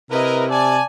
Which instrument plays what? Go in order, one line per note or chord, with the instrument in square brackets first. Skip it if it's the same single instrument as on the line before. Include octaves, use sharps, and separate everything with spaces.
[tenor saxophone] C3 [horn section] E4 A#4 [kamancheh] B4 D#5
[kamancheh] D5 A5 [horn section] G#5